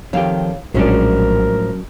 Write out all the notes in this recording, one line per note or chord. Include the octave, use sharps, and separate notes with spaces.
F2 D#3 G4 C#5 F5
A#1 A2 F3 F#3 G#3 C#4 D4 A#4